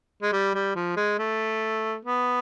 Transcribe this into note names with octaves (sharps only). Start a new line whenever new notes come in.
G#3
G3
G3
F3
G#3
A3
B3